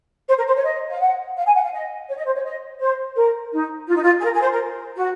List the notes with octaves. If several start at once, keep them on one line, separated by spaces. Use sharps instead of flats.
C5
A#4
C5
C#5
D#5
F5
F#5
F5
G#5
F#5
F5
D#5
C#5
D#5
C5
C#5
D#5
C5
A#4
D#4
F4
D#4
F4
G#4
A#4
G#4
C5
A#4
F#4